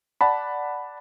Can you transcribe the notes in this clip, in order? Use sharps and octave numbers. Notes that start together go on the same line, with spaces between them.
D5 F#5 A5 B5